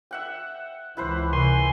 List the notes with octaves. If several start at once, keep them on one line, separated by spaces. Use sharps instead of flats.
E5 F#5 G5
C#2 E3 E4 B4 C5
C3 G#5 C6